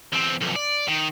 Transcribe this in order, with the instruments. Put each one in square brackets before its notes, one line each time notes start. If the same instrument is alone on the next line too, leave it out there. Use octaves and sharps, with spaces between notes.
[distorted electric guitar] E2 C4
B1 F2
D5
D#3